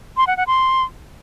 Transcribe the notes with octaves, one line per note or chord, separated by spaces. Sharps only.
C6
F#5
F#5
C6